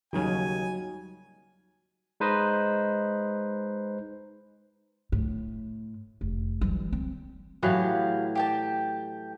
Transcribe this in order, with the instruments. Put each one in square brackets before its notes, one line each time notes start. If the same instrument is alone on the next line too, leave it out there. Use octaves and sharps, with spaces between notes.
[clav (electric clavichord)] D#2 C#3 [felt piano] F#3 D#4 [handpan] G3 F4 F#4 [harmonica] G#5
[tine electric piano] G#3 D#4 B4 C5 D#5
[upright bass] A2
F1
E3 G3
C4
[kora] A2 E3 F#3 [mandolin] G4 F5 A5
[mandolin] G4 G5 A5